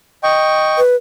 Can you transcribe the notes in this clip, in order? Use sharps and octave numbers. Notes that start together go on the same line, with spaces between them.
D#5 G5 C#6
B4